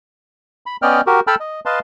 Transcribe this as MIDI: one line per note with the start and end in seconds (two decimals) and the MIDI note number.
0.66 0.76 83
0.82 1.01 59
0.82 1.01 61
0.82 1.01 74
0.82 1.01 75
0.82 1.01 79
0.82 1.01 89
1.07 1.20 66
1.07 1.20 67
1.07 1.20 70
1.27 1.35 69
1.27 1.35 79
1.27 1.35 81
1.27 1.35 83
1.27 1.35 88
1.27 1.35 89
1.40 1.60 75
1.66 1.79 71
1.66 1.79 75
1.66 1.79 77
1.66 1.79 81
1.66 1.79 84